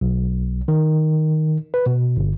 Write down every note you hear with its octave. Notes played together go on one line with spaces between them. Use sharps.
B1
D#3
B4
B2
G1